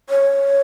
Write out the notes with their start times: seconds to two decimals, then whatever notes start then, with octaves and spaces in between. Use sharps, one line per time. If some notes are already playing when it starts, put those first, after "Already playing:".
0.10 C#5